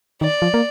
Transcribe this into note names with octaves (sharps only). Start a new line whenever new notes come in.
D#3 D5
F3
A#3